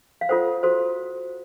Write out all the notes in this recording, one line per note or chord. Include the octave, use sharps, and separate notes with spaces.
F5
F4 A4 C5 F#5
F#4 A4 C5